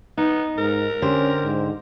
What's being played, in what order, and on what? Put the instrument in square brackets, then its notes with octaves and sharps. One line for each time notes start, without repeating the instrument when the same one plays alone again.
[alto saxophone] B3 [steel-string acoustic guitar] D#4
[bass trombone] G#2 [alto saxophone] A#4
[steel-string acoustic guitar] D3 G4 C5 [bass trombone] C#4
[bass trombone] G#2